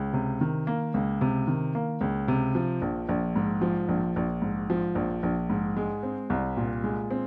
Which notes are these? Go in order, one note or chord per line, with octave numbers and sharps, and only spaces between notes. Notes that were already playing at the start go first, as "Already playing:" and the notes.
Already playing: C#2
C3
D#3
A#3
C#2
C3
D#3
A#3
C#2
C3
F3
A#1
A#1
G#2
F3
A#1
A#1
G#2
F3
A#1
A#1
G#2
G#3
C4
C2
A#2
G#3
C4